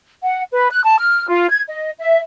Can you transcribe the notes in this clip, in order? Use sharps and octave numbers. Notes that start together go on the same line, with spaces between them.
F#5
B4
F#6
A5
F6
F4
G#6
D#5
E5